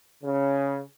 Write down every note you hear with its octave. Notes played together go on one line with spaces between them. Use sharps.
C#3